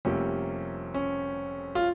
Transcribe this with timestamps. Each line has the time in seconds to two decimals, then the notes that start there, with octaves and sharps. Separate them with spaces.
0.05 F1 F2 C3 G3 A#3 C#4
0.94 C#4
1.75 F4